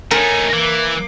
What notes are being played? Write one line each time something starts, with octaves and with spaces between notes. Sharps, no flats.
A3 D#4 A#4 C#5 G#5
E3 A#3 D6